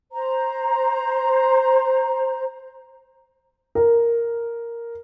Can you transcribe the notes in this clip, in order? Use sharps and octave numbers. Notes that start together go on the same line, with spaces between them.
C5 A#5
A#4